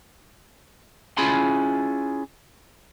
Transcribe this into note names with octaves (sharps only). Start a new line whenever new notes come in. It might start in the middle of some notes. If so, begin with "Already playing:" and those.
C#4 E4 F4 G#4 B5 C6